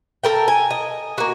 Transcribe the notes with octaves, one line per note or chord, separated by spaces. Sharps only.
A4 A#4 G5
G#5
D#5
A#3 F#4